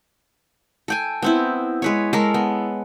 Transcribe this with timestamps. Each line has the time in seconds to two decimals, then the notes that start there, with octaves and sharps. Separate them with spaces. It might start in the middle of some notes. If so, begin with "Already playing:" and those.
0.88 A4 G5 G#5
1.22 B3 C4 E4
1.82 G#3 B4 C#5
2.13 G#3 A4 A#4
2.34 B3